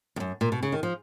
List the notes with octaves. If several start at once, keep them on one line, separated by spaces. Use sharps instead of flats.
F2
F#2
A#2
B2
C#3
D#3
F3